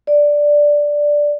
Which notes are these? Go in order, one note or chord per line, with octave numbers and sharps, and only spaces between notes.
D5